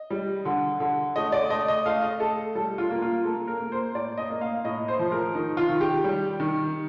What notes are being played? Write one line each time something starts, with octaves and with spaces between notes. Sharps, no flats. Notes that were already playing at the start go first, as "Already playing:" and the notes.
Already playing: D#5
G3
D3
D3
A3 D#5
D5
A3 D#5
D#5
A3 F5
D#5
A3 A4
G3 A4
F4
A#3
F4
A#3 A4
A#4
A#3
C5
A2 D5
D#5
A#3
F5
A2 D#5
C5
F3
A#4
D#3 D#4
F4
D#3
G4
G3
D#3